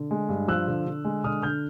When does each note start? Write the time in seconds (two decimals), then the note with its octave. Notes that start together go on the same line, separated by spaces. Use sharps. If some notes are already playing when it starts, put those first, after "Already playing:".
Already playing: D3
0.11 G#3
0.29 G2
0.48 F3 E6 F#6
0.68 D3
0.86 D3
1.05 G#3
1.24 D3 D#6 F6
1.43 D3 F6 G6